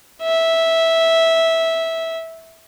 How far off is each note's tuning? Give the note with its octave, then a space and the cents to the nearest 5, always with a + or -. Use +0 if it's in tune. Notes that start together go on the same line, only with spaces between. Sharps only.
E5 -10